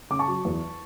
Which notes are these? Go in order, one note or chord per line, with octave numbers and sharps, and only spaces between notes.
C#3 D6
A5 C#6
F#3
E2